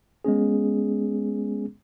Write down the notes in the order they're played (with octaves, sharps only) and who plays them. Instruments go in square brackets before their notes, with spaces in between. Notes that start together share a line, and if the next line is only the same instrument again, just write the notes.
[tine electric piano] G#3 B3 C#4 G#4